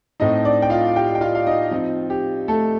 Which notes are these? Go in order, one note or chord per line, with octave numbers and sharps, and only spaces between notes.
A2 A3 C4 D#4 D#5
D4 D5
G5
F4 F5
G4 G5
G5
F4 F5
F5
D#4 D#5
F3 C4 D#4
G4
A3 A4